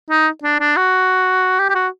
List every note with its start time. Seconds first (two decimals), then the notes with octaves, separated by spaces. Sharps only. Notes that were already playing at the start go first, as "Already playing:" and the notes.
0.10 D#4
0.43 D4
0.60 D4
0.76 F#4
1.59 G4
1.69 G4
1.75 F#4